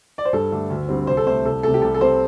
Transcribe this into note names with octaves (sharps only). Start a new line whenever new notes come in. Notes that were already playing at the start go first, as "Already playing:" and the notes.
D5
C5
G2 A4
D3 A3 D4
D2
D3 G3 C4
C2 C5
A4
C3 A3 C5
C2 A4
C3 A3 A4
G4
C2 A4
A4
C3 G3 C4 C5